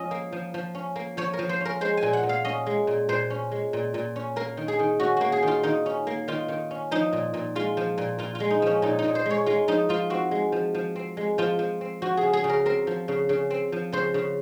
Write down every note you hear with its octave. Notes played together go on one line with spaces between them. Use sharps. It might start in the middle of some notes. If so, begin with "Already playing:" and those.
Already playing: F3 C#4 D#5
A#3
F3
F3
C#4
A#3
F3 C#5
A#4
F3
C5
C#4 A#4
G#3 C5
G#5
A#2
F#5
A#2
F5
C#4 D#5
G#3
A#2
A#2 C5
C#4
G#3
A#2
A#2
C#4
A#3 A#4
D#3
G#4
D#3
C#4 F#4
A#3 F#4
G#4
D#3
F4
D#3 D#4
C#4
A#3
D#3 F4
D#3
C#4
F3 D#4
A#2
A#2
G#3 F4
F3
A#2
A#2 F4
F4
G#3
D#4
F3 C#4
A#2 D#4
D#4
A#2
C5
G#3 C#5
G#3 F4
F3 D#4
F3 F4
C4 F#4
G#3
F3
F3
C4
G#3
F3 F4
F3
C4
F3 F#4
G#4
C#3
G#4
C#3
A#4
C4 A#4
F3
C#3
C#3
C4
F3
C#3 C5
C#3